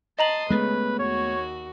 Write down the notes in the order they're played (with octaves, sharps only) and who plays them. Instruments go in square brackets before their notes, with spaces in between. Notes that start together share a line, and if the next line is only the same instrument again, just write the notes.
[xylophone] D#5 A#5 F#7 [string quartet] A5 C6 D#6
[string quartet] C#3 [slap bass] G#3 A3 B3 [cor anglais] B4
[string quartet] D#2 F#4 [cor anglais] C#5